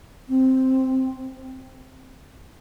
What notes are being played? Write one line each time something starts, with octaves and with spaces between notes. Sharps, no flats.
C4